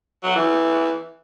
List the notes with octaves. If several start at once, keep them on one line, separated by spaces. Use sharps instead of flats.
F#3
E3